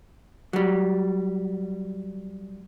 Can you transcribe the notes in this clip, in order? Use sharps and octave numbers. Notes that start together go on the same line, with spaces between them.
F#3 G3